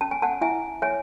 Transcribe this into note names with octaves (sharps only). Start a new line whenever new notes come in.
C#4 A5
G#5
F#5 A5
E4 E5 G#5
C#5 E5 G#5